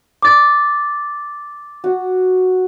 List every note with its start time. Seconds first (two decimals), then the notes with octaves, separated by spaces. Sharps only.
0.22 D6 A6
1.84 F#4